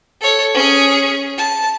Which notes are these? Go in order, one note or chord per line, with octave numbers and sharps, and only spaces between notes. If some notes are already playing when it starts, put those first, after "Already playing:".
A4 C#5
C#4 G#4
A5